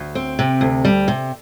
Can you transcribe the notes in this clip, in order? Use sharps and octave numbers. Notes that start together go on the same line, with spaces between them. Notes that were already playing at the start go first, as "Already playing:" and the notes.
Already playing: D2
C4
C3
D2
G3
C3